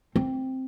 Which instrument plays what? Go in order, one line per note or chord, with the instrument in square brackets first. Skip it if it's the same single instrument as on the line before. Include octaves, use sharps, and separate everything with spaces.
[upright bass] C4